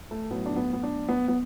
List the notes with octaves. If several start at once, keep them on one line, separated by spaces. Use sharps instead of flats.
A3
B1 A2 F#3 B3
D4
B3
B3
D4
B3
B3